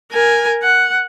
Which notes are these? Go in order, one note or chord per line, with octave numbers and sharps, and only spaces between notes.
A#4 G#5
F#5